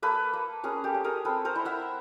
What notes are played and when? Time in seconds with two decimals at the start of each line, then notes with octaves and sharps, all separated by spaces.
0.02 A#3 A4 B4
0.33 A#3
0.64 C#4 G#4 A#4
0.84 G4 A4
0.94 C#4
1.04 G#4 A#4
1.25 C4 A4 B4
1.45 A#4 C5
1.55 E4
1.65 E5 F#5